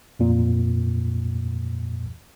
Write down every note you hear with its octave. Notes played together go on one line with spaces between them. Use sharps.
F2 A#2